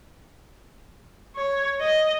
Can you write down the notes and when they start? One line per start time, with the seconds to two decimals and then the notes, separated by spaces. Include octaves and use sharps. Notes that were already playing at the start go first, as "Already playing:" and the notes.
1.36 C#5
1.81 D#5